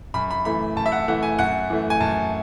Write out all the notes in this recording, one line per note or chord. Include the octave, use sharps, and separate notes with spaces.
F#2 B5
B5
E3 A3 B5
F#2 A5
E5
F#5
E3 A3 F#5
G#5
F#2 F#5
E3 A3
G#5
F#2 A5